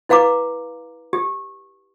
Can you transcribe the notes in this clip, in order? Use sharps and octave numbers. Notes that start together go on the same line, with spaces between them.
E4 B4 F5 A#5 D6
G4